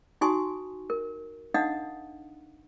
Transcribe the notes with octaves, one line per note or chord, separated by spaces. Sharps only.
D#4 F#4 G#5 C6 C#6 D#6
A#4
D4 D#4 D#5 F5 F#5 D#6